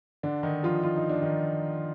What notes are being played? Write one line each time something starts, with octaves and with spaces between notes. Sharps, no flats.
D3 D4
D#3 D#4
F3 F4
F4
D#4
D4
D#3 D#4